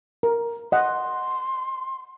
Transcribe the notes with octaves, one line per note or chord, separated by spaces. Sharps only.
A#4
D#5 F#5 C6